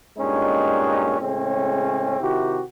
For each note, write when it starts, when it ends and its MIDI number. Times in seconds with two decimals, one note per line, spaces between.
0.18 1.16 43
0.18 1.16 46
0.18 1.16 56
0.18 1.16 61
0.18 1.16 63
1.21 2.19 45
1.21 2.19 49
1.21 2.19 56
1.21 2.19 60
1.21 2.19 61
2.20 2.62 48
2.20 2.62 51
2.20 2.62 64
2.20 2.62 66
2.20 2.62 67